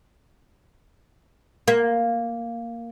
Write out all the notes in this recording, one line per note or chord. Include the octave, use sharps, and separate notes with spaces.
A#3